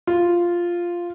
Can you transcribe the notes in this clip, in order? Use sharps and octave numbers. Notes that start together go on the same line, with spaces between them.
F4